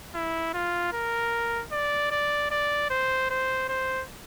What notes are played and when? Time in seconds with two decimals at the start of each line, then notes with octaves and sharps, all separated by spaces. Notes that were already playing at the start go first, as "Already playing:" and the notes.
0.14 E4
0.54 F4
0.93 A#4
1.72 D5
2.11 D5
2.51 D5
2.90 C5
3.30 C5
3.69 C5